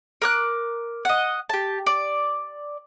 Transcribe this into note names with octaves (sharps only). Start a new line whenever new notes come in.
A#4 D6 F#6
D#5 F#5
G4 A5
D5